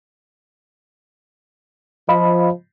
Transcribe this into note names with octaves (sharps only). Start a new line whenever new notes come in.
F3 D#5 F5 B5